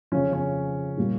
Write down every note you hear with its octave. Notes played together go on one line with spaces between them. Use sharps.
F2 C#3 F3 C#4
C#4
A#2 G3 A#3